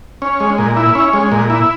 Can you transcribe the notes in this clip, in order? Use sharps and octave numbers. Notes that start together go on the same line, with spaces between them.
C#4
G#3
A#2
E4
C#4
G#3
A#2
E4